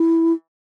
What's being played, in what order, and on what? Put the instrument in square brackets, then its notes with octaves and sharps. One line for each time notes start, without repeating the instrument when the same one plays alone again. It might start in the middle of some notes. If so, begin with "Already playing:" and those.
Already playing: [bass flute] E4